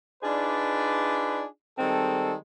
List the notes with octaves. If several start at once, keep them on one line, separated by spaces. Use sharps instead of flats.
D4 D#4 F4 G#4 B4 D5
D#3 G3 G#3 C4 A4